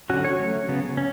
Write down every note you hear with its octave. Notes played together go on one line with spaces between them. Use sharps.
D3 F#3 C#4 F#4
C#5
F#3 A3 C#4
C#3 F#3 B3
C#4